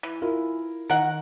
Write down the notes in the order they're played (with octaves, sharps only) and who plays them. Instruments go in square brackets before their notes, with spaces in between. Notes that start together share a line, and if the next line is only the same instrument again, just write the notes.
[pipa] E3
[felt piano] E4 F4 A#4
[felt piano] D#3 [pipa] A#4 F#5